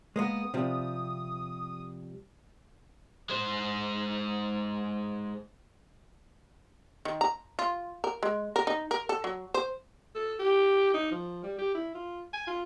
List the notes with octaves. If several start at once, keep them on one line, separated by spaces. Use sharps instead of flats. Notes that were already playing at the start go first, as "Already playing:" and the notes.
G#3 A#3 B3 D#6
C3 F3 G3
G#3 C5
D#3
A#5
F4
A#4
G#3
A#4
D#4
A#4
A4
F#3
C5
A4
G4
D#4
F3
G3
G4
E4
F4
G#5
F4